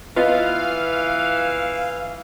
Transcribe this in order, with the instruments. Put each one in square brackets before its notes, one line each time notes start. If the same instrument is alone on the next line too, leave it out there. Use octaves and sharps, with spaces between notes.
[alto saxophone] E3 [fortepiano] B3 F4 D#5 [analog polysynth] F5